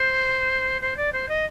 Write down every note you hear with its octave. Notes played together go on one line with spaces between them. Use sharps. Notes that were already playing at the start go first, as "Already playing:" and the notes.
Already playing: C5
C5
D5
C5
D#5